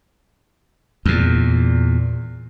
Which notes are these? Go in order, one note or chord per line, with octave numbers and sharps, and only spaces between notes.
E2 A#2